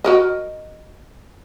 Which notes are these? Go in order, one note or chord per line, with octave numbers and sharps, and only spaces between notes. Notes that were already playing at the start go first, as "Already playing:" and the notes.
F#4 A#4 D#5